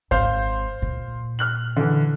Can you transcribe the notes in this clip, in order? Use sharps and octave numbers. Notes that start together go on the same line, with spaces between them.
G#1 C5 F5 G6
A#2
F6 F#6 F#7
D3 E3